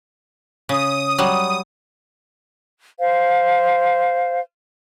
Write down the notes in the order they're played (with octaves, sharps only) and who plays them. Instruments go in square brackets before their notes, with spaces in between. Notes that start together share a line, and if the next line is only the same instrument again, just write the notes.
[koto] C#3 [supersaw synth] D#6
[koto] F#3 G3
[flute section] C5 F5